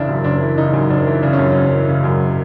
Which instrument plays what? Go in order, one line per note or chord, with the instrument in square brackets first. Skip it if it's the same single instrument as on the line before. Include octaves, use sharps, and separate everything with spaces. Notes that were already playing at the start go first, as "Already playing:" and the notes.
Already playing: [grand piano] F#1 C#3 E3 D4 E4
F#2
F#1 D4
E3
C#3 D#4
F#2
F#1 D4
E3
C#3 D4
C#4
F#2
F#1 C#4
E3
C#3
F#2